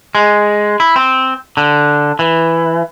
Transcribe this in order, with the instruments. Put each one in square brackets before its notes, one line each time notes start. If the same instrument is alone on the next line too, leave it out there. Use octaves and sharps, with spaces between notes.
[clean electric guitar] G#3
E4
C4
D3
E3